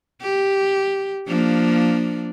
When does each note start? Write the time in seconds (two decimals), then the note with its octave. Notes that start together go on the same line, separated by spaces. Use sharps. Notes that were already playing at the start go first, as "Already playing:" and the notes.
0.22 G4
1.27 F3 A#3 D4